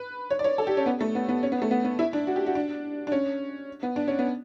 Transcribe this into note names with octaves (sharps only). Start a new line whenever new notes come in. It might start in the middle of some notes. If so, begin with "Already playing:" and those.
Already playing: B4
C#5
D5
C#5
A4
G4
C#4
B3
A3
B3
B3
C#4
B3
A3
B3
B3
E4
D4
F#4
G4
F#4
D4
D4
C#4
B3
D4
C#4
B3